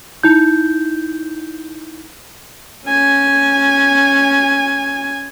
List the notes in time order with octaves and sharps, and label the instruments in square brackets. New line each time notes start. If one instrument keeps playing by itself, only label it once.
[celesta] D#4 E4 G6
[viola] C#4 G#5